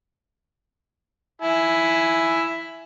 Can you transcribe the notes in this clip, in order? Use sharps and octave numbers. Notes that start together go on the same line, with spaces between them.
E4 G#5